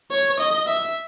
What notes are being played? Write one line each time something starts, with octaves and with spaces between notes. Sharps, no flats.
C#5
D#5
E5